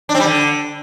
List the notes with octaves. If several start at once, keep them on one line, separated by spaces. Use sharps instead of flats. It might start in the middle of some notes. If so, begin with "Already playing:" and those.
D4
C4
G3
D3